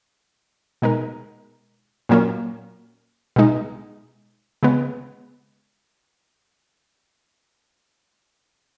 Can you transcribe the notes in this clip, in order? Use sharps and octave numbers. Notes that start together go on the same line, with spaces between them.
B2 G#3 D#4 A#4
A#2 F#3 A#3 C#4
B2 G#3 D#4
C#3 G#3 B3